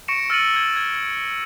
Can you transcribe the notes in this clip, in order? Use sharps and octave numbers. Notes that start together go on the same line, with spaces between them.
C#6 A#6 C#7 D7 E7
E6 F6 A6 C#7 D#7 F#7
G#6
G#6